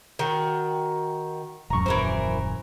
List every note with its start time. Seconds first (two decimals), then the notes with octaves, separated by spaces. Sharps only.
0.19 D#3 F#4
1.70 D#1 F#2 A#5 C#6
1.86 E3 A#4 C5